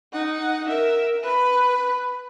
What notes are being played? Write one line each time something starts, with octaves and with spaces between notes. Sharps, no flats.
D#4 F#5
A#4 E5
B4 B5